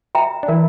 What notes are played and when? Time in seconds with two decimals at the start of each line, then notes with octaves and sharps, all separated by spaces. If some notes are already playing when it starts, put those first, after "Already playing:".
0.15 E5 G5 A#5
0.43 D4
0.48 E3 E4 A#4